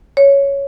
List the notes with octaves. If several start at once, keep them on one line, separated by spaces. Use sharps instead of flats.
C#5